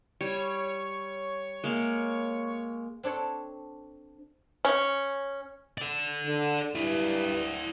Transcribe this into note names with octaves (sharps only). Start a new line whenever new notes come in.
G3 C#5
G#3 A#3
C4 D4 A4 C#5
C#4
A4 D5
D3
G2 E4 D5